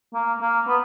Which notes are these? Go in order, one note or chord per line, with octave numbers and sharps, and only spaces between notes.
A#3
A#3
B3